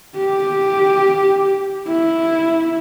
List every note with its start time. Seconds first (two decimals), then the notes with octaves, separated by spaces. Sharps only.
0.16 G4
1.88 E4